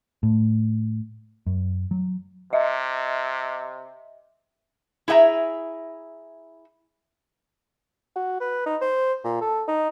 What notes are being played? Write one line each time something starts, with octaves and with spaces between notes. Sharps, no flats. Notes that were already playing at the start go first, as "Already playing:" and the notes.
A2
F#2
F#3
C3 D#5 E5
E4 G#4 E5 G5 A#5
F#4
B4
D#4
C5
A#2
A4
D#4